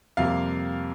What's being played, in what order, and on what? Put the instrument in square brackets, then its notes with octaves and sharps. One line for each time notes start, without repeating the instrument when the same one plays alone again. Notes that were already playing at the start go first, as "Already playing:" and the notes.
[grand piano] F2 C3 G3 A#3 F5